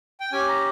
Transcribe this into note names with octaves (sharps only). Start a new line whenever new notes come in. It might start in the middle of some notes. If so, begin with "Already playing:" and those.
G5
C#4 G4 G#5
A#5